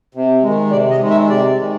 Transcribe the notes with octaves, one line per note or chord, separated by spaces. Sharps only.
C3
D#3 G#3
C3 D5
D#5
D#3 G#3
E5
C3 D5
D#3 G#3